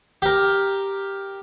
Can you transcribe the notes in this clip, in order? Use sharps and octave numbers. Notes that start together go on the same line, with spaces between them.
G4 A#4